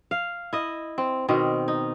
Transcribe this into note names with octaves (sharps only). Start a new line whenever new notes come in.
F5
E4 D#5
C4
B2 D#3 C4
D#4